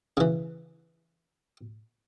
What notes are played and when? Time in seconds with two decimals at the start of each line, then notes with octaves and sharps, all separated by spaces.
0.17 C#3 E3